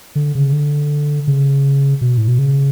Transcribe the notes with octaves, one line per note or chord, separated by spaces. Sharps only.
D3
C#3
D3
C#3
B2
A2
B2
C#3